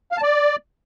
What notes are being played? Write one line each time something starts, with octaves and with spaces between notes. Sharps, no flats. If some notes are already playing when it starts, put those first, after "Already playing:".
F5
A5
D5